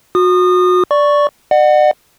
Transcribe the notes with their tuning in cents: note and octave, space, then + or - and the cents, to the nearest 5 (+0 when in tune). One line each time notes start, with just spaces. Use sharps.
F#4 -30 D#6 -30
D5 -5 C#6 +0
D5 +45 F#5 +0